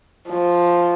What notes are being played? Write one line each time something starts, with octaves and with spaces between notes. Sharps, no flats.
F3